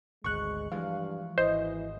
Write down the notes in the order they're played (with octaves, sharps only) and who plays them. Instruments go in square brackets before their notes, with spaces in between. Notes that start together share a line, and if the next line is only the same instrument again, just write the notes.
[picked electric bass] G#1 D2 [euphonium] G#3 [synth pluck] C#6 F#6
[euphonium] G2 [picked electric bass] E3 F3 G#3 [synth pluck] F5
[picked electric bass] G#1 [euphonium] E3 [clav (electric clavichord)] C5 [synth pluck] D#5